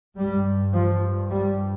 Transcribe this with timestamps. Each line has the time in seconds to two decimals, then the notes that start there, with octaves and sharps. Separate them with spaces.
0.17 G2 G3
0.73 F3
1.31 G3